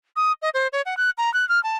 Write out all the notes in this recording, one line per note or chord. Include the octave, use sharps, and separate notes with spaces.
D#6
D#5
C5
C#5
F#5
F#6
A#5
F#6
F6
A5